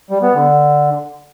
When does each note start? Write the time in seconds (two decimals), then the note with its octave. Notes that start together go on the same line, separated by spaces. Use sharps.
0.11 G3
0.22 B3
0.34 D3